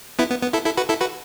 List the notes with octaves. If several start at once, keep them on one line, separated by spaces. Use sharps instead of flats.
B3 E4
B3
B3
E4 A4
E4 A4
F#4 B4
E4 A4
F#4 B4